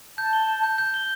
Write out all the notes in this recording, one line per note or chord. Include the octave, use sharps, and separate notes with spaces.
A5 G6
G7
E7
G6
G6
G7